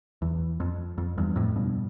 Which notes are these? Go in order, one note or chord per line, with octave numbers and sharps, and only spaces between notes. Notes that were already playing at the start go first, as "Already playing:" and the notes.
E2
F2
F2
E2 G2
F2 A2
G2 B2